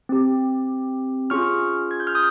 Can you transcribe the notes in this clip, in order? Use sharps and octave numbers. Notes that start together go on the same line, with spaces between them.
C4 G4
C#4 F4 G#4 C#6 F6
G#6
G6
F6
D#6 G6